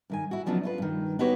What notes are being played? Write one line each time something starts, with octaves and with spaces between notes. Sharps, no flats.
G2 D#3 G#5
E4 F#4
C#3 F3 F#3 B3 D4 D#4
E4 F4 B4
G2 D#3
B3 D#4 F#4 G4 B4 C#5